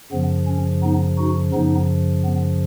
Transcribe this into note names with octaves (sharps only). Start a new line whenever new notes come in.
F#2 C#3 F3 B3
C#4
B3 D#4
D#4 F#4
F#2 C#3 F3 B3 D#4
B3